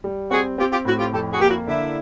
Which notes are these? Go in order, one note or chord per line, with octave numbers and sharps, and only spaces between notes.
G3
C4 F#4 G#4
C4 F4 G4
F4 G4
A2 E4 F#4
F4 G4
F2 G4 A4
F#4 G#4
A#3 G4
E4 F#4
D3 D4 E4